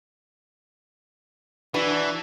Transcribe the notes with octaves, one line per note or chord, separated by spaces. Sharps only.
E3 D4 F#4 B4